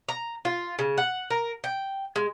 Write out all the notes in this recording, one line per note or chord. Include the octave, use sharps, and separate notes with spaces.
A#5
F4
C#3
F#5
A#4
G5
G#3